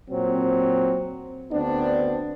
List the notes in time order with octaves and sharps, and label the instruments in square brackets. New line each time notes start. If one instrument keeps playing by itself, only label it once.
[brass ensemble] A#2 F#3 C4
D2 B3 C4 D4